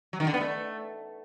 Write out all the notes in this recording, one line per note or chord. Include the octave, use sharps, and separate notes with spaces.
F#3
D#3
D3
B3
A3